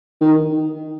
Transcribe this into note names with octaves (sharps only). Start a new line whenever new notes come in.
D#3